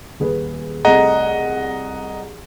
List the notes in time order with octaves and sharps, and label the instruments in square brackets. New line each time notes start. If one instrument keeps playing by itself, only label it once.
[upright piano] D#1 G#4 B4
[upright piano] C2 A3 G#4 [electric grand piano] D#5 F#5 A#5